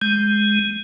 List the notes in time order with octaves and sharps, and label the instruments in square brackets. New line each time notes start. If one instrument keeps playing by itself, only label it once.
[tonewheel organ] G#3 [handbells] G6